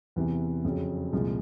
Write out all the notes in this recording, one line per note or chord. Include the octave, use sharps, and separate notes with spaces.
E2 C3 E3
F2 C#3 F#3
C2 A#2 F3 G#3